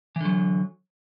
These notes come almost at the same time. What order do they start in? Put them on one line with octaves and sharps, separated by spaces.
E3 D3 F#3